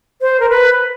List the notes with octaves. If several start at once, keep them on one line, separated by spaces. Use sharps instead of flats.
C5
A#4
B4